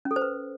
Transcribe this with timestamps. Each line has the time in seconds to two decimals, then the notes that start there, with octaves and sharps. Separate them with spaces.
0.05 C#4
0.11 A4
0.16 C5
0.22 B4